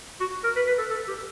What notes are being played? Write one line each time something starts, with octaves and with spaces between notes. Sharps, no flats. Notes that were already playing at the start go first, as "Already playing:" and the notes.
F#4
A#4
B4
B4
A4
A4
G4